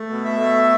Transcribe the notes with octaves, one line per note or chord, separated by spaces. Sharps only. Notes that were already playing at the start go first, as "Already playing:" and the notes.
Already playing: A3
B2
E5
A3